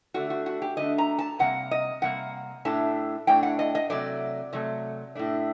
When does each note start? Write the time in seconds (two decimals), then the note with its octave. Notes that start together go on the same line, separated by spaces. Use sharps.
0.14 D3 A3 D4 F#4
0.30 F#4
0.46 F#4
0.62 G4
0.77 D3 A3 D4 D#5
0.98 A#5
1.19 A5
1.39 C3 G3 A#3 F#5
1.71 D#5
2.02 C3 G3 A#3 F#5
2.65 A2 A3 D4 A5
3.27 A2 A3 D4 G5
3.43 F#5
3.59 D#5
3.75 D#5
3.90 C3 F#3 A3 D5
4.53 C3 F#3 A3
5.15 A2 A3 D4